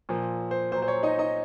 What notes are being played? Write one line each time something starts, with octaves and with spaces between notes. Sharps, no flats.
A#2 F3
C5
A#2 F#3 C5
C5
C#5
D#4 D#5
D#4 D#5